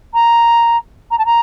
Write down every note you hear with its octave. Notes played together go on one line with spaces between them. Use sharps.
A#5
A#5
A5
A#5